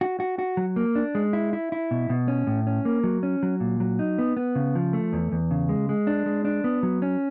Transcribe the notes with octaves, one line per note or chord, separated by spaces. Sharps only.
F#4
F#4
F#4
F#3
A#3
D4
G#3
E4
E4
E4
B2
B2
C#4
A2
C#4
A#3
F#3
C#4
F#3
A#2
F#3
D#4
B3
B3
C#3
F3
A3
E2
E2
C#3
G#3
G#3
D4
G#3
D4
B3
F#3
C#4